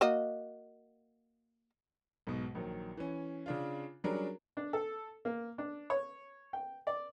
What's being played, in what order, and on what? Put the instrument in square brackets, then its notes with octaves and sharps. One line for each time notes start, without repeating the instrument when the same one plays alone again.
[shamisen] A#3 F#4 D#5
[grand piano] B1 G#2 B2
A#1 D#3 F#3
E3 C#4
C#3 D4 F4
F#3 G3 C#4 D4 G#4 A#4
[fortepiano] D4
A4
A#3
D4
C#5
G5
D5